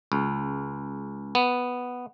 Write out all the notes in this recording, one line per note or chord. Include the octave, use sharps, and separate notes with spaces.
C#2
B3